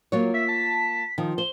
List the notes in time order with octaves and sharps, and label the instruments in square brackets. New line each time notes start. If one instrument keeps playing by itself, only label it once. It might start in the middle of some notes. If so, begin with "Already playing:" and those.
[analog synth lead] F#3 [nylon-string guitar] A#3 F4 C#5
[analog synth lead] E5 [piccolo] B6
[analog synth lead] A5
[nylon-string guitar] D#3 [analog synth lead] F3
[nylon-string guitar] C5 [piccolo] G7